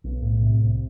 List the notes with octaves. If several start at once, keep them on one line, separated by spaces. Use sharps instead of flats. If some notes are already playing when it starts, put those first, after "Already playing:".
B1
A2
C3
C2